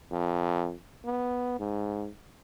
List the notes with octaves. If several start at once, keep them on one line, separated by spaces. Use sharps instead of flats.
F2
B3
G#2